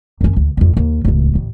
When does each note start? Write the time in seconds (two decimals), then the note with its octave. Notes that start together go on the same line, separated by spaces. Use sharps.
0.21 F#2 C#4
0.36 D2
0.57 F2 A2
0.77 D#2
1.05 D1 C#2
1.35 A1